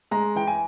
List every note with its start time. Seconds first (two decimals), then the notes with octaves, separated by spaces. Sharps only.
0.11 G#3 A#5
0.35 E3 G5
0.47 G#5